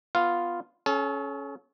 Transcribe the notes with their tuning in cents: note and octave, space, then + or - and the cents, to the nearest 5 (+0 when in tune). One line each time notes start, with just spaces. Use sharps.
B3 +5 F4 +0 F5 +0
C#4 +0 A4 -40